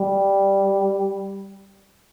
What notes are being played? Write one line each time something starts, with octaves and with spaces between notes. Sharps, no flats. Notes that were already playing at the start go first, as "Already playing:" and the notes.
Already playing: G3